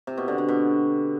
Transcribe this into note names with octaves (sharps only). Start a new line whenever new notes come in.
C3
B2
D3
D3
B2